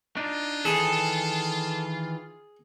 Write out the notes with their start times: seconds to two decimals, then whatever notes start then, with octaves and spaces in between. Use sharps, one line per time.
0.17 D4 D#4 F4
0.65 D#3 E3 G#4 A4